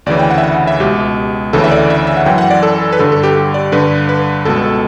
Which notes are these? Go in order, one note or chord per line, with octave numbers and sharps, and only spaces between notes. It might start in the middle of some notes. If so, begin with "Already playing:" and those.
D2 C#3 E3 D5
G5
F#5
E5
F#5
E5
C#2 B2 G4
D2 C#3 E3 A4
E5
D5
E5
E5
F#5
F#2 E3 G5
F#5
D5
A4
B4
G2 D3 A4
A4
G4
G4
D5
G2 D3 B4
B4
C#2 B2 A4